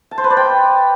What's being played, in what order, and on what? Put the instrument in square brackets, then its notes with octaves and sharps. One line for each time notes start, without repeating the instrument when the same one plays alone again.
[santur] A5
C5
B4
D5
G5